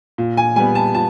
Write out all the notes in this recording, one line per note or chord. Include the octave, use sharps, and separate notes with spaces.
A#2
G#5
G3 B3 G#5
A5
A#2 A5